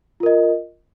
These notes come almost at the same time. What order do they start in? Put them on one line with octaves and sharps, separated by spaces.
F4 A#4 D#5